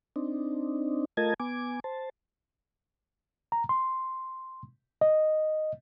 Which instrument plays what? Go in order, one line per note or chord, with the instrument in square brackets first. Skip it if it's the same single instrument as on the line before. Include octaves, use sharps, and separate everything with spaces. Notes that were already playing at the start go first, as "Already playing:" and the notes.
[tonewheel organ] C4 D4 D#4
A3 F4 A#4 D#5 A5 G#6
B3 G#5 D6
C5 A5
[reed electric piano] A#5
C6
D#5